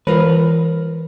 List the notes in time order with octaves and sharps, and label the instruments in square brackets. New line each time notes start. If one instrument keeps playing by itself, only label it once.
[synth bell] E3 [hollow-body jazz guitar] F4 A#4 B4